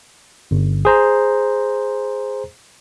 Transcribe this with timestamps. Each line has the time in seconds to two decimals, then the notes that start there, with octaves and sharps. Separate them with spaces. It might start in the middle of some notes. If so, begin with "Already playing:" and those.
0.51 G1
0.85 G#4 C5 A#5